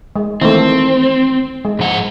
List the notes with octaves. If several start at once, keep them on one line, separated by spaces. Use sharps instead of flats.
G#3
D#3 E3 A3 C4
G#3
G#2 F3 F#5